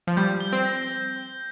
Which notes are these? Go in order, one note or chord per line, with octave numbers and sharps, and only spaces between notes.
F3
G3 G6
G7
C4
A#6